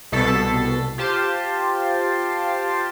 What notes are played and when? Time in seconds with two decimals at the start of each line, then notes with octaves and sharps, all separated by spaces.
0.12 C2 B2 A4 A6 B6 C7
0.98 F4 G4 C5 A5 C6